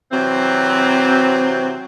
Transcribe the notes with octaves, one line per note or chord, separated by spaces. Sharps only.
C3 E3 F#3 C4